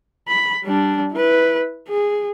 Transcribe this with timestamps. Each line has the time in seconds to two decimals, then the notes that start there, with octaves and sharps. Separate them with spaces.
0.28 B5
0.64 G3 D4
1.12 E4 B4
1.88 G#4